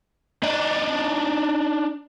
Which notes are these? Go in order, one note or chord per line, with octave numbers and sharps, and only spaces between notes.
D4 D#4